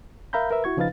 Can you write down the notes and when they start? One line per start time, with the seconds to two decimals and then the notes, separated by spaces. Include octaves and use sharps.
0.33 A#4 E5 F5 A#5 B5 G6
0.51 A#4 B4 E5
0.64 E4 F#4 C#6 G#6
0.77 C#3 F3 D#4 B4 F5 A6